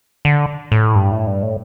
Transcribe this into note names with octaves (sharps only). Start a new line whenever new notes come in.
D3
A2
G2
A2
G2
A2